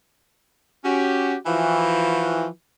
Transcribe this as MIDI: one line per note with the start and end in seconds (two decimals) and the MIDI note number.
0.85 1.36 61
0.85 1.36 66
0.85 1.36 67
1.46 2.48 52
1.46 2.48 53
1.46 2.48 66